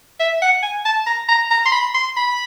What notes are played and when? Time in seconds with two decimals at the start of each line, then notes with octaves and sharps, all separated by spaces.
0.20 E5
0.42 F#5
0.63 G#5
0.85 A5
1.06 A#5
1.28 A#5
1.51 A#5
1.66 C6
1.72 B5
1.94 C6
2.17 B5